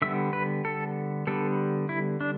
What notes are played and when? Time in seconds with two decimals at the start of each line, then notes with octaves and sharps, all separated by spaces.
0.02 D3 G3 B3 E5
0.33 B4
0.65 A4
1.27 D3 G3 B3 A4
1.89 E4
2.21 D4